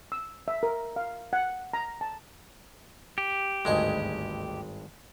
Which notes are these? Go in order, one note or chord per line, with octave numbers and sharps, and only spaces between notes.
E6
E5
A#4
F5
F#5
A#5
A5
G4
G#1 D2 G2 G#3 G#4 D#5